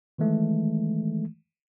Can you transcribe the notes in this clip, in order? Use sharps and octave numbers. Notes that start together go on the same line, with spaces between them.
D#3 E3 G#3 A3